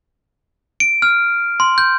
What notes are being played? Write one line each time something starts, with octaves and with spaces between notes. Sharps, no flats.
D7
F6
C6
G6